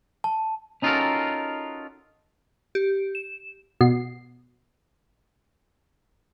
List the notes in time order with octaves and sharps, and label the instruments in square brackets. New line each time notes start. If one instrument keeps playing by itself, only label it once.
[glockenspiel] A5
[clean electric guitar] C#4 D#4 F4 F#4 A4 A#4
[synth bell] G4
E7
[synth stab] B2 C7